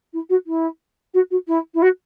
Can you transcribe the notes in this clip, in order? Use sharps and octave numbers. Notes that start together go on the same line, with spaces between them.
E4
F#4
E4
F#4
F#4
E4
E4
F#4